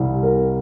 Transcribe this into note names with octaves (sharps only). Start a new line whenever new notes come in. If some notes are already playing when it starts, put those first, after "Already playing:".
Already playing: C2 C3 G3 C4
A#4